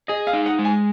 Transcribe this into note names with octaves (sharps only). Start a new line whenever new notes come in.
G#4 D#5
F5
D#4
F#5
G#3
G#5